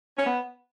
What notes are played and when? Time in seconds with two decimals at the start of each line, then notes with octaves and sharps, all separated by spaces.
0.17 C#4
0.25 B3